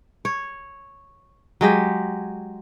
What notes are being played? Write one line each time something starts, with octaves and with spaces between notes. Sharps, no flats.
C#5
F#3 G#3 G4